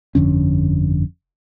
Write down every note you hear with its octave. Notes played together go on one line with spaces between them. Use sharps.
G1 F2 D3 C#4